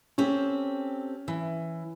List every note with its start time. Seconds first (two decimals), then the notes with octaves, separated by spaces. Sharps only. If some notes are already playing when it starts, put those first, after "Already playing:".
0.18 C4 C#4 G4 A4
1.28 E3